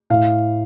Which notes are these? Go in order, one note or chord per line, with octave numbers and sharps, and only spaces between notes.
A2 F5